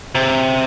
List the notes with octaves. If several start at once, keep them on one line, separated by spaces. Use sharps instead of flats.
C3